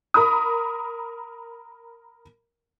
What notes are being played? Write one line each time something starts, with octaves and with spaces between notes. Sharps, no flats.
A#4 B5 D#6